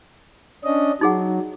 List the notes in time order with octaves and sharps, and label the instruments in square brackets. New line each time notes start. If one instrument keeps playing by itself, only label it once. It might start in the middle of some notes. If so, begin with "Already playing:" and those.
[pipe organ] C#4 D4 D#5
[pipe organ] F#3 [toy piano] D#4 G#4 F#5